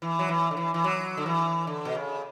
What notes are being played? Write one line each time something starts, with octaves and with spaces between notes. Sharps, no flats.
E3
F#3
E3
D3
E3
E3
F#3
D3
E3
D3
B2
C#3